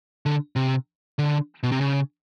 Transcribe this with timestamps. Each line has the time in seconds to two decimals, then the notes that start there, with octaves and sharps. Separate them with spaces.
0.26 D3
0.56 C3
1.19 D3
1.63 B2
1.72 C3
1.81 C#3